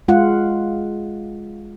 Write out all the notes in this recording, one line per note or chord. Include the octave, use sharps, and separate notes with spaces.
G#3 F4 F#5